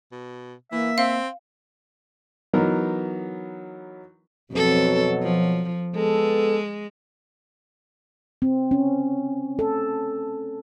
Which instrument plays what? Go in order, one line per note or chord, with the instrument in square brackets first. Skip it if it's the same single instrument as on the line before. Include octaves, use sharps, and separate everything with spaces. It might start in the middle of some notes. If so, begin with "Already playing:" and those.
[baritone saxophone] B2
[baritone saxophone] E3 [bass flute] A#3 [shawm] E5
[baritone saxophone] C4 [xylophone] F5
[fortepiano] E3 F#3 B3 D#4 A#4
[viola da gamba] F2 C4 A4 [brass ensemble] B2 F#3
[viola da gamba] F3
[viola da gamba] G#3 [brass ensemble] B3 A4
[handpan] C4
C#4
A4